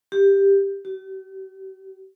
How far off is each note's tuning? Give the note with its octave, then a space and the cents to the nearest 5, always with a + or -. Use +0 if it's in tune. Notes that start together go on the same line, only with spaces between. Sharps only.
G4 +10
G4 -45